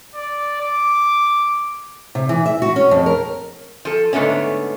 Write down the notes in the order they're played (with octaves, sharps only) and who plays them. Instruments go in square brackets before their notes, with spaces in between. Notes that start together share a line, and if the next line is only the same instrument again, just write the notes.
[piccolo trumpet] D5
D6
[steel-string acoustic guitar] C3
E3
E5
F#4
C#4
F2
A#4
[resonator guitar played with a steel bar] F3 A4
G#2 D3 A3 B3 C#4